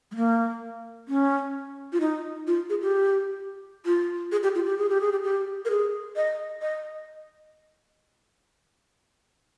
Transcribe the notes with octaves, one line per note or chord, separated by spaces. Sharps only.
G#3
A#3
C#4
F4
D#4
F4
G#4
G4
F4
G#4
G4
F4
G4
G#4
G4
G#4
G4
G4
A#4
G#4
D#5
D#5